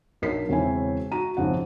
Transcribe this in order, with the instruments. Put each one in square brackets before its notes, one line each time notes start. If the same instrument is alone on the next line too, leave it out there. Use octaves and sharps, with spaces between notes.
[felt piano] B1 D4 A#4 B6 C7
E1 C#3 C4 C#4 E4 G#5
F#4 A#5 D#7
G#1 F2 C#3 F#5